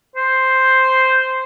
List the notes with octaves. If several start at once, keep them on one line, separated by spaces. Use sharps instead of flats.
C5